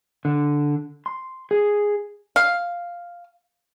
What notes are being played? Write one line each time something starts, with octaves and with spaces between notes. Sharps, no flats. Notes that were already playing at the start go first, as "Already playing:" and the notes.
D3
C6
G#4
F5